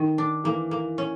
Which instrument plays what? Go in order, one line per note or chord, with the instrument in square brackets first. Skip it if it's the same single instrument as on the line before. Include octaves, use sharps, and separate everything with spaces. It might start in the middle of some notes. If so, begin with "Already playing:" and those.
Already playing: [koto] D#3
D4
[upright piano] E3 [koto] A#3
[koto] A#3
C#4